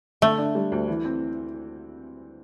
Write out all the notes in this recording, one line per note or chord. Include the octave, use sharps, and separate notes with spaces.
D3 A3
D4
G3
D2
E3
C4